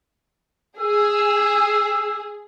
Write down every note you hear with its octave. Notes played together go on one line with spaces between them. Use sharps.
G#4 E6